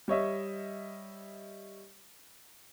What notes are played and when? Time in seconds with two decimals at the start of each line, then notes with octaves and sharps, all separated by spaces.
0.08 G3 C#5 D#5 E5